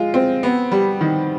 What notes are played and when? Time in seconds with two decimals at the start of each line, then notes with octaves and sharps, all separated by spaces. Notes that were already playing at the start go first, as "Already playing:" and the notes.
Already playing: G#3 F4
0.14 C4
0.43 B3
0.72 G3
1.01 D#3